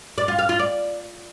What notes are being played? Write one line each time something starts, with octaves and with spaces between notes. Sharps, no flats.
D5
F4
F5
F4
D5